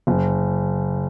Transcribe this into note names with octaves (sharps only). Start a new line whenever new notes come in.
F#1